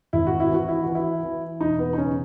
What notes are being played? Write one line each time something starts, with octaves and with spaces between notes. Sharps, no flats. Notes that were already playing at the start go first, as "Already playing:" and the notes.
G#1 E4
F#4
E4
E3 F#4
E4
E3 F#4
E4
E3
E1 D#4
B3
D#4
C#3 C#4